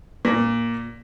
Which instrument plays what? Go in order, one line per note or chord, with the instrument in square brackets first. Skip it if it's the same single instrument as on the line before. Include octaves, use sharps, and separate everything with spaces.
[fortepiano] A#2